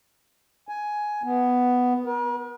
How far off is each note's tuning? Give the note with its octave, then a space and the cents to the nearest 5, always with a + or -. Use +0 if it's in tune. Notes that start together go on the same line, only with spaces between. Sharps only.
G#5 +10
B3 +5
A#4 +45